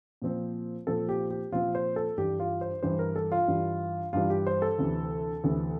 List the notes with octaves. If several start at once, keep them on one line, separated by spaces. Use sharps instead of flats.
A#2 F3 C4
A#2 F3 C4 A4
G4
G4
A#2 F3 C4 F4
C5
A4
G2 E3 G3 G4
F4
C5
G2 E3 G3 C5
A#4
A4
F4
G2 E3 G3
G2 E3 G3 F4
G4
C5
A4
D2 C3 E3
D2 C3 E3